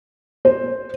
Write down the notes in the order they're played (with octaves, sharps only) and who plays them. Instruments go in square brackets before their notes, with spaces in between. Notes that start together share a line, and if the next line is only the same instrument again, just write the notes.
[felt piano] C5